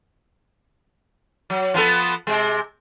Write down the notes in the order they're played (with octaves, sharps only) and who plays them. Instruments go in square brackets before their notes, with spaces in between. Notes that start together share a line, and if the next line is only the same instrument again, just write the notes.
[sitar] F#3
F3 B3 A4
C3 G#3